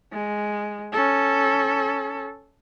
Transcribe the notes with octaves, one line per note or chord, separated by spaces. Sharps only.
G#3
C#4 A4